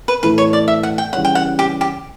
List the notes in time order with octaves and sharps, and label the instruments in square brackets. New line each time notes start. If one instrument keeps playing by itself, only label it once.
[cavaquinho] B4
[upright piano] A2 E3 A3 E4 [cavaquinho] B4
[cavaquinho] C#5
D5
E5
F#5
G5
[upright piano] C#3 E3 G3 C#4 [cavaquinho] F#5
[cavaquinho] G5
F#5
G4
G4